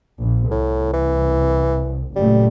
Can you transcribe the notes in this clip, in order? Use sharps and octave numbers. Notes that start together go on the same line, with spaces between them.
A#1
C2 A2
E3
F#1 A#2 G3 A3